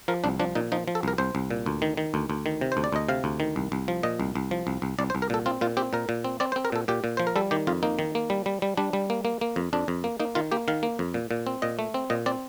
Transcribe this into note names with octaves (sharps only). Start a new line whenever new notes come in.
F3 A#4
C2 D4
F3 D4
A#2 D#4
F3 D#4
F3
A4
C2 A#4
C2 C5
C2
A#2
D2
D#3
D#3
D2
D2
D#3
C3
C5
D2
D5
D2 D#5
C3 F5
D2
D#3
C2
C2
F3
A#2 D#5
C2
C2
F3
C2
C2
C2 D5
C5
C2
A#4
A#2 A4
C4 F4
A#2 F4
C4 G4
A#2 A#4
A#2
C4
C4 D5
C5
C4
A#4
A#2 A4
A#2 G4
A#2
F3 C5
A#4
G3 A4
D#3 G4
F2 F4
A#3 D#4
D#3
A#3
G3
G3
G3
G3 D4
G3
A#3
A#3
A#3
F2
F2 D4
F2
A#3
A#3 D#4
D#3 F4
A#3 G4
D#3 F5
A#3
F2
A#2
A#2
C4
A#2 D#5
A3
C4
A#2 D#5
C4 D5